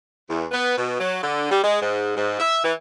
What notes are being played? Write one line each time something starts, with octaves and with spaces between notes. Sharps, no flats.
E2
B3
B2
F#3
D3
G3
G#3
G#2
G#2
E5
E3